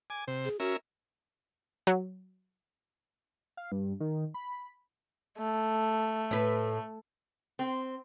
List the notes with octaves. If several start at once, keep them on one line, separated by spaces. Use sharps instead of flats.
G#5 D6
C3 C5
G#4
C#4 F#4 A#4 E5
F#3
F5
G2
D#3
B5
A3
A2 B4
C4